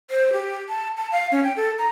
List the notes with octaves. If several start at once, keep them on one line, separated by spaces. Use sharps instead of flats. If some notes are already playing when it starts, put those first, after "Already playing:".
C5
G4
A5
A5
F5
C#4
G5
A4
A#5